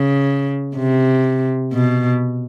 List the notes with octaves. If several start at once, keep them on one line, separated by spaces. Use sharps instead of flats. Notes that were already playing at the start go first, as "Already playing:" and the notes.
Already playing: C#3
C3
B2